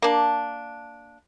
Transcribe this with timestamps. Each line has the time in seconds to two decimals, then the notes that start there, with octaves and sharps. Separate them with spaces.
0.02 A#3 D4